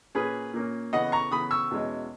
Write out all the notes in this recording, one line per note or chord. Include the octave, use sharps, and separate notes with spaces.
A#2 A#3 C#4 G#4 B4
A#2 A#3 C#4
C#3 E3 B3 D#5 F#5
A#5 C#6
C#3 E3 B3 B5 D#6
C#6 E6
E2 B2 G#3 C#4